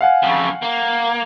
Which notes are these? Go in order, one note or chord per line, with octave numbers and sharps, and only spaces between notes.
F5 F#5 G#5
F2 C#3
A#3